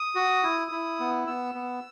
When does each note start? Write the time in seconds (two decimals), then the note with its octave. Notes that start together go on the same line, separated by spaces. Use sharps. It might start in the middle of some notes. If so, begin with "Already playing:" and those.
Already playing: D#6
0.15 F#4
0.43 E4
0.72 E4
1.00 B3
1.27 B3 E6
1.55 B3